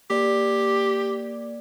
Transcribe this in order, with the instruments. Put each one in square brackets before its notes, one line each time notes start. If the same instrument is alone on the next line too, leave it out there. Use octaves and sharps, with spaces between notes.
[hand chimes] A#3 D5 [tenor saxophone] G4